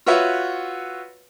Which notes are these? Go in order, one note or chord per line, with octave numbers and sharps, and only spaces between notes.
F4 F#4 B4 C#5 E5